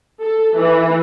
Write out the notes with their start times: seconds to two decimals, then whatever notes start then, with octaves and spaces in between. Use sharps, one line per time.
0.21 A4
0.55 E3